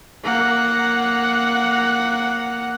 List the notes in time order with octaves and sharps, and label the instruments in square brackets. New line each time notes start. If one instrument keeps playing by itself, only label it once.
[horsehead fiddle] A#3 F#5